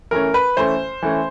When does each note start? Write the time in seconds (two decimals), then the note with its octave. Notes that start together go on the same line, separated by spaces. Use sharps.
0.11 E3 A3 C#4 A#4
0.34 B4
0.57 E3 A3 C#4 C5
1.02 E3 A3 C#4